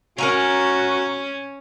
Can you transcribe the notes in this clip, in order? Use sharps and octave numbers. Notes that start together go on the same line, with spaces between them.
C#4 F#4 A#4 G#5 A#5